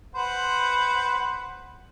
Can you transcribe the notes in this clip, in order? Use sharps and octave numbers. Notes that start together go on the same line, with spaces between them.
B4 C5 F#5